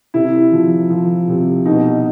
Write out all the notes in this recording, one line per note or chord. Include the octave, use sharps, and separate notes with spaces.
C3 E4
F3
F3
C3
B2 D#4